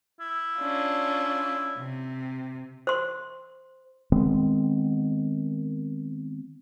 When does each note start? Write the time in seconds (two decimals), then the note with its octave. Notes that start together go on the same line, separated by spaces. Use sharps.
0.20 E4
0.59 C#4 D4 F4
1.78 C3
2.87 C5 C6
4.12 D#3 G#3 B3 C4